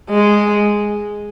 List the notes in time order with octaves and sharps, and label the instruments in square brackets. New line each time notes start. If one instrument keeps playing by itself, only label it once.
[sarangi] G#3